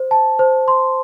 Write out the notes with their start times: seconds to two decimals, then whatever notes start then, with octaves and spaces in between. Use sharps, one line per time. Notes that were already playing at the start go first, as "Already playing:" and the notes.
Already playing: C5
0.11 A5
0.39 C5
0.68 C6